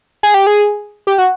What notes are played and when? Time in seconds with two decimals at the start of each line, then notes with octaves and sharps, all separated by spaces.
0.23 G#4
0.34 G4
0.47 G#4
1.07 G4
1.18 F#4